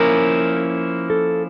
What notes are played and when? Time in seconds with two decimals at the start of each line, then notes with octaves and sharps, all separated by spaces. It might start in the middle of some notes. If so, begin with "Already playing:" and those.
Already playing: F3 A#3 C#4 E4 A#4
1.10 A4